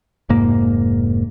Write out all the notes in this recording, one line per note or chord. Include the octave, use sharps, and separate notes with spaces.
F1 G#2 A#3